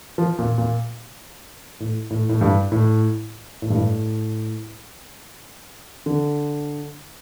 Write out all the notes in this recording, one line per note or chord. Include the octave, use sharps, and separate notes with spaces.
F3
A#2
A#2
A2
A2
A2
G2
A2
A2
G2
A2
D3